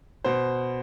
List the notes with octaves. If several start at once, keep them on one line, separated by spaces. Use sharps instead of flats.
B2 C5